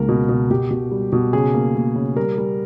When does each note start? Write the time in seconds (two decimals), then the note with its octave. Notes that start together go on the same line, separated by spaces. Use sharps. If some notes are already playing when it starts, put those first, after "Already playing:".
Already playing: C#2 A#3 A#4
0.09 B2
0.29 B2
0.51 B2 G4
0.71 B2
0.92 G3
1.12 B2
1.33 C#3 G#4
1.54 A#3
1.76 A#3
1.96 C#3
2.16 G3 A#4
2.38 G3